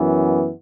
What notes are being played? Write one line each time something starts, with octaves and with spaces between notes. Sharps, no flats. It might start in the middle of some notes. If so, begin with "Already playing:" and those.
Already playing: F#2 E3 B3